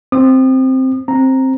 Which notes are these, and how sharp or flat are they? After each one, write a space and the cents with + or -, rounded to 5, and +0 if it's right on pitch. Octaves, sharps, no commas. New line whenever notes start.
C4 +0 D#6 -40
C4 +10 A#5 +0